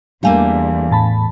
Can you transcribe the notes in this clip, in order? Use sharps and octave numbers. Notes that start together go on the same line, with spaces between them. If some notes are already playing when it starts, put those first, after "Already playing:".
E2 G3 A3 A#3 D4 F5 G#5
A2 A5 B5